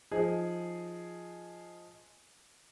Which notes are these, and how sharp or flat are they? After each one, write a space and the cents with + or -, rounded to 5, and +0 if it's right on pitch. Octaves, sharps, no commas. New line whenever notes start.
F3 +0 D#4 +0 G#4 +0